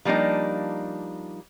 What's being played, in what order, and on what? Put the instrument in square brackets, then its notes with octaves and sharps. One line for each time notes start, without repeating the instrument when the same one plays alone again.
[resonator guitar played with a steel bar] F3 G3 A#3 D4 D#4